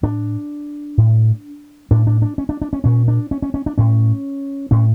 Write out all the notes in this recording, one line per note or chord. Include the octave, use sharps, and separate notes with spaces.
A2 D4
A2
A2 D4
D4
D4
C#4
D4
D4
C#4
A#2 C#4
D4
C#4
C#4
C#4
D4
A2 C#4
A2 C#4